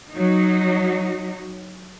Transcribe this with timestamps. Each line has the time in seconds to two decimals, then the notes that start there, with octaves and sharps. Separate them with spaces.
0.12 F#3 D#4